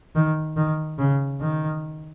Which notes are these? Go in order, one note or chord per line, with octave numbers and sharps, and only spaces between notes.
D#3
D#3
C#3
D#3